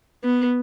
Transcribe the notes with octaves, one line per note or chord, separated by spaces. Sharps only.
B3